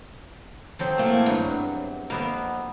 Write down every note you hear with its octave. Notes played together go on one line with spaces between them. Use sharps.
F3 F#3 C4
A3 A#3 E4
E2 G2 F#3
F2 A#3 B3 E5